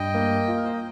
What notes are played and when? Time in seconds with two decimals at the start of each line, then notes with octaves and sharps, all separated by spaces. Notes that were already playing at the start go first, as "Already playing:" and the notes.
Already playing: G2 D#5 G5
0.14 A#3
0.48 F4
0.57 A#4
0.65 C5
0.73 D#5